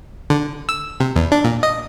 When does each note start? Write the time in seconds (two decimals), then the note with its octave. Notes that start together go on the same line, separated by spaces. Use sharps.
0.30 D3
0.69 E6
1.00 C3
1.16 E2
1.32 D4
1.44 A#2
1.63 D#5